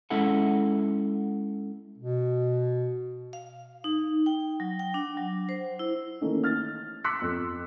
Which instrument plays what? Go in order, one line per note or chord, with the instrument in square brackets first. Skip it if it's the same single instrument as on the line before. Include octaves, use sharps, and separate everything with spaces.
[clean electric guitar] G#3 C#4 E4 A4 E5 F#5
[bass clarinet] B2
[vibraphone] F5
D#4
G5
F#3
G5
D4
F#3
C5
E4
[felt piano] D#3 E3 A3 A#3 C#4
F6 A6
C6 D6 E6 F#6 B6 C#7
F2 F#6